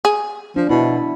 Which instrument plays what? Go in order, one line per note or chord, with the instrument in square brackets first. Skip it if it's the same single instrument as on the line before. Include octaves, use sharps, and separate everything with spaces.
[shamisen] G#4
[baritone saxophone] F3 [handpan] D4
[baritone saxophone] B2 [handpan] E4